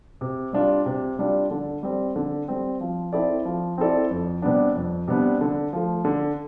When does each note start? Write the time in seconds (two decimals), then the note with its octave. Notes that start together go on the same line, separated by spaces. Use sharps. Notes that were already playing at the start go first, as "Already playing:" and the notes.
0.21 C3
0.53 G3 D4 F4
0.86 C3
1.19 G3 D4 F4
1.51 D3
1.83 G3 C4
2.16 D3
2.48 G3 C4
2.81 F3
3.13 C4 E4 A4 D5
3.45 F3
3.78 C4 E4 A4 D5
4.11 F2
4.42 C3 G3 B3 D4
4.75 F2
5.08 C3 G3 B3 D4
5.41 D3
5.73 F3 A3
6.05 D3